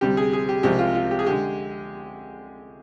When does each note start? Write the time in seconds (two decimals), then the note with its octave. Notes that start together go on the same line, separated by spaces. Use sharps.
0.01 D2 C3 G3 G4
0.17 G#4
0.33 G#4
0.49 G4
0.63 C2 C3 F3 G#3 G4
0.79 F4
0.95 F4
1.11 G4
1.19 G#4
1.26 D3 G#3 G4